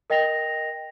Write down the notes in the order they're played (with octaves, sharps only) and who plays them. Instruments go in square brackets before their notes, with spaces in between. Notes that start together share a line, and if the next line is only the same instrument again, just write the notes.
[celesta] A#4 D#5 G5 A#6 F7